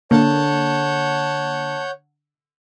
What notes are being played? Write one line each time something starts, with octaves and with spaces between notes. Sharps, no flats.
D3 A#3 C#5 F#5 A5 G6